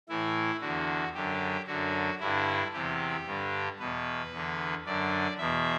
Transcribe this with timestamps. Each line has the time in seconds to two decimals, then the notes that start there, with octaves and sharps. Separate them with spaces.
0.09 A2 E3 E4
0.61 E2 D3 F#4
1.14 F#2 D3 G4
1.67 F#2 D3 F#4
2.20 G2 D3 E4
2.73 E2 C3 E3 G4
3.26 G2 D3
3.79 E2 B2 B4
4.32 E2 D3
4.85 F#2 D3 D5
5.38 E2 B2 E5